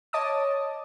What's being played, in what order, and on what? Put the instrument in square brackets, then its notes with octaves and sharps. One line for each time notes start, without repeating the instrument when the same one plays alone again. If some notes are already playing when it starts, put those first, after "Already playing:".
[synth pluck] C#5 D#5 A5 D6 D#6